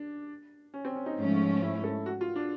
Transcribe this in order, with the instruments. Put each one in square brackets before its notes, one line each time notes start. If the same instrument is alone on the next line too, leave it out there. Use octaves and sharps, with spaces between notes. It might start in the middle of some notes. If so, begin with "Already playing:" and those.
Already playing: [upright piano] D4
C#4
C4
C#4
D#4
[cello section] G#2 F3 A3 C#4
[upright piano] E4
A4
F#4
F4
D4